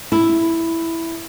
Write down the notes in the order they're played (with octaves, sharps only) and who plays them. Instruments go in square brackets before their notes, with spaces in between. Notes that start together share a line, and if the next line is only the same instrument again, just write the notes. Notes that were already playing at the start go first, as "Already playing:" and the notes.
[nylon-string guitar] E4